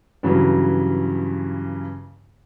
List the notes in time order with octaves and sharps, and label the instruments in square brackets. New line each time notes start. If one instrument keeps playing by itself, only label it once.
[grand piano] G2 C#3 E3 F#3